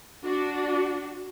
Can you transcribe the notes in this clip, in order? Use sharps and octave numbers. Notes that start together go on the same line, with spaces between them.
D4 F#4